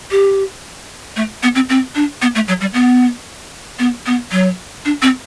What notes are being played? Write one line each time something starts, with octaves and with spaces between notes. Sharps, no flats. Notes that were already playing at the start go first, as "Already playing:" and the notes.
G4
A3
B3
C4
C4
D4
B3
A3
F#3
G3
B3
B3
B3
F#3
D4
C4